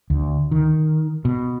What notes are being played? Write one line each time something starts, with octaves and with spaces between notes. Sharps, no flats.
D2
D#3
B2